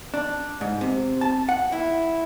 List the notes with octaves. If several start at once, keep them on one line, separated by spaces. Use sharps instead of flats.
D4
G#2
C3
A5
F#5
E4